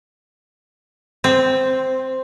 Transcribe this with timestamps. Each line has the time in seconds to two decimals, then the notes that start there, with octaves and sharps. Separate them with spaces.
1.24 C4